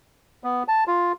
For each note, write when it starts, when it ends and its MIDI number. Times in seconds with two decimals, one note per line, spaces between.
0.44 0.63 59
0.68 0.84 81
0.87 1.12 65